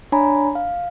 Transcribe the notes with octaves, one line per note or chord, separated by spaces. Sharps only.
D4 C#5 G#5 A#5 B5
F5